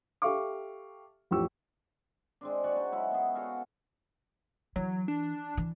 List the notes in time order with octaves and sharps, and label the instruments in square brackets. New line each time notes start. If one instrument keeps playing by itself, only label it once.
[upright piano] G4 A4 E5 F5 C#6 D6
A1 F2 G4 C#6 E6
[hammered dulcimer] G#3 C4 D4
F#4 C#5 D5 F#5
C#4 D#4 C5
F#3 G#3 C#4 E4
B3 G#4
F#4 A4 D#5 F5
[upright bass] E3 [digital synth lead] F#3
[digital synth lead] D4
[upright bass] E3